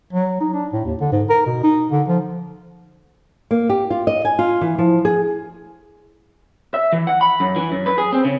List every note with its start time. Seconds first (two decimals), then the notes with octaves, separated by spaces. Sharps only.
0.13 F#3
0.41 D#4
0.53 D4
0.73 A2
0.85 D#2
1.01 D3
1.12 G#2
1.30 A#4
1.46 B2
1.64 D#4
1.92 D3
2.08 F3
3.51 A#3
3.69 G4
3.90 F4
4.07 D#5
4.25 G#5
4.39 F4
4.61 E3
4.78 F3
5.05 G#4
6.74 E5
6.93 E3
7.07 F#5
7.21 B5
7.40 F#2
7.56 E3
7.72 F#2
7.86 B4
7.98 G#4
8.12 C4
8.25 C#3